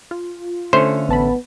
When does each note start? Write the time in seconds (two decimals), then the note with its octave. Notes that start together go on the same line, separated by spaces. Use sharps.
0.11 F4
0.73 D3 A3 C#4 C5
1.08 A1 B3 A5 B5